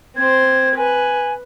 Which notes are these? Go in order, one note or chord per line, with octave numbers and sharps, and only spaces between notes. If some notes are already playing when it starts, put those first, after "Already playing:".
C4 C5 G#6
B4 G#5